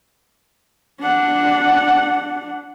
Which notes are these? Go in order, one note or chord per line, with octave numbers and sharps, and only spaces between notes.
D4 F#5